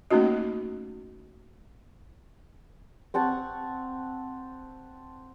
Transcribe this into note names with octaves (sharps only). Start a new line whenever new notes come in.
A3 A#3 C#4 D#4 F#4 D#5
C4 F#5 A5 C#6